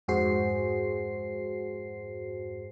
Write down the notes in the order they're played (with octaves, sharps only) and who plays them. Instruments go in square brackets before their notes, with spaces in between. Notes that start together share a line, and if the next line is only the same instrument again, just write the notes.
[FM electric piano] F2 G#2 F#4 G#4 C5 C7